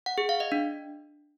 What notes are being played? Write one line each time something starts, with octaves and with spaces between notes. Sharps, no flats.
F#5
G#4
F5
D#5
D4